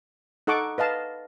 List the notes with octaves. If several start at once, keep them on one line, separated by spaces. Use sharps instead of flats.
D#4 A4 F#5 C#6 D6
B4 D#5 F5 A5